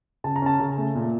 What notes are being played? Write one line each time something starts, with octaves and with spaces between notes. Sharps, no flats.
C#3 A5
A#5
C#4 A5
C#3
A3
A#2